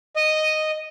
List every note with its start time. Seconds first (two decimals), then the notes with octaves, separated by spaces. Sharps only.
0.16 D#5